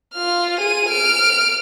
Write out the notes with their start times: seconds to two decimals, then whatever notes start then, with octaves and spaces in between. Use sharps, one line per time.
0.14 F4 F6
0.60 G#4 D#7
0.89 F6 D7